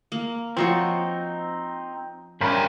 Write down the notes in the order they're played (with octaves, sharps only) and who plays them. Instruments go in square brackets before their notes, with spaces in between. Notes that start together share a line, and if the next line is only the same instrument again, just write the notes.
[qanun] A#3
[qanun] F3 F#4 C#5 [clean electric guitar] C4 D#4
[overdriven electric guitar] G2 C#4 [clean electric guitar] A#4 C5 B5